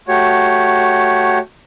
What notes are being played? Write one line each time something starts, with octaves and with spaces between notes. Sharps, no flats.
A3 F#4 G4 C#5